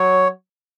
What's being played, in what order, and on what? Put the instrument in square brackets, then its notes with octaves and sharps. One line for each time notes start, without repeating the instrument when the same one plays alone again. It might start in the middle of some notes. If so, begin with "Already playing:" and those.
Already playing: [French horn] F#3 [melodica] C#5